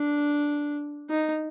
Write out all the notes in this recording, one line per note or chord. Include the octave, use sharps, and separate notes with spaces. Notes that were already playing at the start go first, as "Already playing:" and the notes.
Already playing: D4
D#4